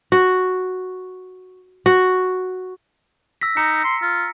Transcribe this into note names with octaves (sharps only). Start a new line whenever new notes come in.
F#4
F#4
E6 A#6 B6
D#4 A#5 C#7
C6
F4